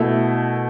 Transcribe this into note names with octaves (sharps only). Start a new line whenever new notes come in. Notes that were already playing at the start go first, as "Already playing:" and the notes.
Already playing: B2 A3 E4